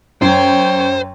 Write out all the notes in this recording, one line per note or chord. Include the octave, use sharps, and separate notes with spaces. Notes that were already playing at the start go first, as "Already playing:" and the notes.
F#2 C5 C#5 G5